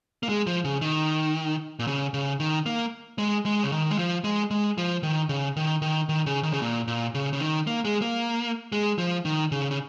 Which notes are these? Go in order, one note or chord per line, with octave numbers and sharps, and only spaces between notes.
A#3
G#3
F3
C#3
D#3
A#2
C#3
C#3
D#3
A#3
G#3
G#3
C#3
D#3
G#3
F3
G#3
G#3
F3
D#3
C#3
D#3
D#3
D#3
C#3
D#3
C#3
A#2
A#2
C#3
C#3
D#3
A#3
G#3
A#3
G#3
F3
D#3
C#3
C#3